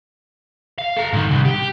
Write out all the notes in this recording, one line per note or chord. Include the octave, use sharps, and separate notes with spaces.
F5
A4 A#5
G#2 D#3
C2
G4